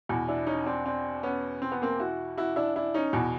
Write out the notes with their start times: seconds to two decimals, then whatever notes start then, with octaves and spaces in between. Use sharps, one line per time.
0.09 E2 B2
0.29 D4 E4
0.47 C#4 D#4
0.66 C4 D4
0.86 C4 D4
1.23 B3 C#4
1.62 C4
1.72 B3
1.82 A#3 C4
2.00 E4 F#4
2.37 E4 F#4
2.56 D4 E4
2.76 D4 E4
2.94 C#4 D#4
3.13 E2 B2